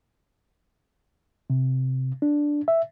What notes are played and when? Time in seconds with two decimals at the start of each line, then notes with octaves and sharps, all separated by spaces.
1.50 C3
2.22 D4
2.68 E5